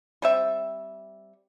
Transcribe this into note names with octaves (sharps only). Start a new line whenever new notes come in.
G3 C4 E5